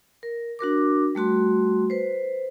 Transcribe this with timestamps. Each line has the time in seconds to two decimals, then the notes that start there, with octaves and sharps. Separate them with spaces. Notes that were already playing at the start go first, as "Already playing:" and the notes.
0.23 A#4
0.59 D4 F#4 A#4 D6
1.15 G3 A3 F#4 C6
1.90 B4 C5